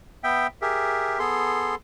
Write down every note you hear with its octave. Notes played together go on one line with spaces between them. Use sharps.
B3 E5 G5
G4 G#4 A#4 E5
B3 G#4 A4 C6